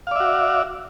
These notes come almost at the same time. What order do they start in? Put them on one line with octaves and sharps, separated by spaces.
F5 D5 E5 F#4